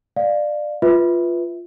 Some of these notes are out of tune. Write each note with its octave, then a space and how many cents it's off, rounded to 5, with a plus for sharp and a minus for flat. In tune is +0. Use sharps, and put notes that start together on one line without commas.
D5 +20 F5 +0
F4 -5 B4 +0 E5 -15